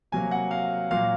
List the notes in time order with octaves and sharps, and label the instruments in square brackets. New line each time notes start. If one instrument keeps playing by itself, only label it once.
[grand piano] C3 F#3 A#3 G#5
F#5
F5
A#2 F#3 A#3 F5